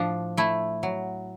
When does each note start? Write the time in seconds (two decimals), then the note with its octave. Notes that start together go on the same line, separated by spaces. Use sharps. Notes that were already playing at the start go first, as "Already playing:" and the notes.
Already playing: A2 F3 D4
0.37 A3 E4
0.83 F#3